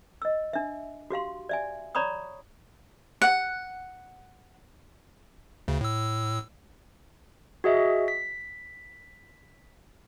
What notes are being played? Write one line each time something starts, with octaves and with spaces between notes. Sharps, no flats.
D#5 E6
D4 E5
F#4 G4 F5 C6
D5 E5 G#5
C#5 D5 A#5 B5 C#6 D#6
F#5
D2 C#3
A2 E6
F#4 G#4 D#5 E5
B6